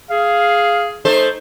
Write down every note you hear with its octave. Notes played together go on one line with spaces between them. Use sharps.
G#4 F5
A3 D#4 A4 C5